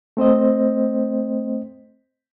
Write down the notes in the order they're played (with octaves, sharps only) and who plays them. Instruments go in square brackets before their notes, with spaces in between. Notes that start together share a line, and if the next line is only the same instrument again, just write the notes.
[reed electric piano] A3 C4 C5 D#5